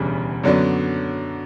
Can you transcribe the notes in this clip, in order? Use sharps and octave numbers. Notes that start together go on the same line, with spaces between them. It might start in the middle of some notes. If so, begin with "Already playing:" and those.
Already playing: E1 D2 C#3 E3 G3
F#2 D3 F#3 B3 D4